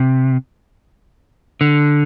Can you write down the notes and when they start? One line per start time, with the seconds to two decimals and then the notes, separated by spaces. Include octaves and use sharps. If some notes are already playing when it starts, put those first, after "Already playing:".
Already playing: C3
1.61 D3